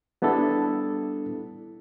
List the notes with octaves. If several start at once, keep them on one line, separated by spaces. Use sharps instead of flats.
G3 B3 D4 E4 A4